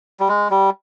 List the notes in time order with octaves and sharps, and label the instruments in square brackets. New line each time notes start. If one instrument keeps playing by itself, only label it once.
[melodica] G3
G#3
G3